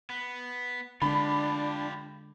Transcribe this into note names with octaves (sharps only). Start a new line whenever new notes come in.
B3
D3 G#3 D4 F4 G4 B5